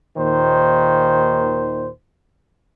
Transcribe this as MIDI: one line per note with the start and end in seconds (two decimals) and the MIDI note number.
0.17 1.89 39
0.17 1.89 46
0.17 1.89 51
0.17 1.89 72